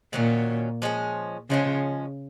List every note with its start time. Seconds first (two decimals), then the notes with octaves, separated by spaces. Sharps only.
0.13 A#2 D#3 F#3 C#4
0.82 F3 G#3 C#4
1.50 C#3 F3 G#3 C#4